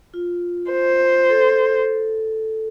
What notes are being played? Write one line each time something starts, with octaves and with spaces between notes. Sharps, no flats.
F4
C5
A4